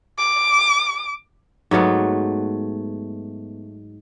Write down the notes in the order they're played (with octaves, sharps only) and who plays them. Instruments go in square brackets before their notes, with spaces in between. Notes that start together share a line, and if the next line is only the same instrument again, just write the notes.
[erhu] D6
[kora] G#2 F#3 A3 B3